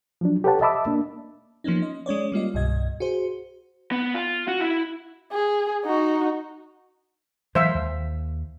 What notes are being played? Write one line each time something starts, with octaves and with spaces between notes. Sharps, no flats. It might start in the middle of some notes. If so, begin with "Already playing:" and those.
F3 F#3 D4
G4 A4 B4 C#5 F#5 A5
D#5 E5 A5 B5 D6 E6
A#3 D4
F3 A#3 B3 C#4 D#4
D#5
G#3 C#4 C#5 D5
G3 A#3 F4 D#5
C2 G2 B2 D#5 G#6
F#4 G#4 C5
B3
F4
F#4
E4
G#4
D#4 F#4
E3 F#3 G#3 C5 E5 F5
D#2